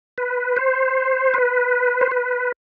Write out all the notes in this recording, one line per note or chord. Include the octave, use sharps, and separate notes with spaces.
B4
C5
B4
C5
B4